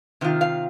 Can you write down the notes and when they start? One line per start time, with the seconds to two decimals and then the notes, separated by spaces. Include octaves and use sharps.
0.21 C3 D#3 F4
0.41 F5